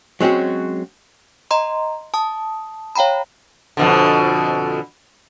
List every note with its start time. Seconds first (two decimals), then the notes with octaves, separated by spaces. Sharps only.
0.21 F#3 G#3 C4 C#4 F#4
1.51 D#5 A#5 C6
2.14 A5 D#6
2.95 C#5 F5 G5 A#5 B5
3.77 F2 B2 D3